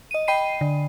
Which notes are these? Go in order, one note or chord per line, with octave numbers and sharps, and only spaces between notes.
D#5 D#7
D#5 G5 B5 C7 D#7
D3